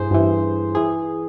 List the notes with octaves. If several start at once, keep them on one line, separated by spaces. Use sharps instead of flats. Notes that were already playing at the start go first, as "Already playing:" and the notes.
Already playing: G2 E3 G#4 C5
G2 E3
E3 G#4